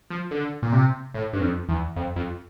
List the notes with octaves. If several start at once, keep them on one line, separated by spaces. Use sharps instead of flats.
F3
D3
A#2
C3
A2
G2
F2
E2
F2
F2